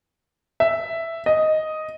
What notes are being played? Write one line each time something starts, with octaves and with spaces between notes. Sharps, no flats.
E5
D#5